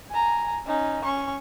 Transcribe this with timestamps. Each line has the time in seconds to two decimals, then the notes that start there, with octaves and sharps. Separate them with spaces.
0.11 G#5 A#5
0.66 C#4 D#4
1.04 C#4 C#6